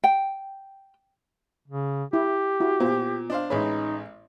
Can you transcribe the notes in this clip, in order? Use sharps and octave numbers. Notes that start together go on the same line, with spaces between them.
G5
C#3
E4 G4
E4 F#4
A#2 B3 F4 C5
D4 C5 D#5 F5
A1 G#3 D#4 B4 C#5